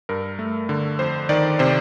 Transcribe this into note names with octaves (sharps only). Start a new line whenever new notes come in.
G2 A#4
A3
D3
F2 C5
D#3 D5
C3 C5